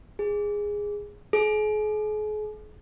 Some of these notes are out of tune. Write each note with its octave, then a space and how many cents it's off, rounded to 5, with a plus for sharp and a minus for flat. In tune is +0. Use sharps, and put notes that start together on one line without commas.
G#4 -10
G#4 +40